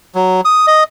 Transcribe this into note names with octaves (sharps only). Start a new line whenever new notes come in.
F#3
D#6
D#5